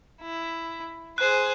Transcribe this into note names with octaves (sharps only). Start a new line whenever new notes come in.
E4
G#4 C5 F#6